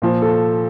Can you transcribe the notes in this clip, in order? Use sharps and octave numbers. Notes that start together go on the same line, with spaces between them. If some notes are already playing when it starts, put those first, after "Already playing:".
A#2 F3
A4